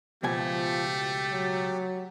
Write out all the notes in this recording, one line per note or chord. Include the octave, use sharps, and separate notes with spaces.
C#2 B2 F3 A3 G4 G#5
F#3